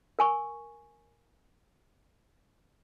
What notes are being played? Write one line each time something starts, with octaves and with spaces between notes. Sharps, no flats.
A#4 G#5 C#6